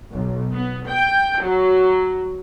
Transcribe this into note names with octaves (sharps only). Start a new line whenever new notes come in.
B1
B3
G5
F#3